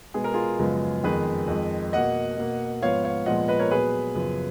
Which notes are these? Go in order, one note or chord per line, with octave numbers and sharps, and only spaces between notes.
B2 G#3 B3 G#4
A#4
F4 G#4
F#2 C#3 F3 G#3 B3
F2 D#3 G#3 B3 G#4 B4
F2 D#3 G#3
B2 A#3 D#5 F#5
B2 A#3
G#2 F3 B3 C#5 F5
C#5 F5
A#2 F3 G#3 B3 D#5 F#5
B4 D#5
A#4 C#5
A#2 F#3 B3 G#4 B4
F#2 C#3 F3 B3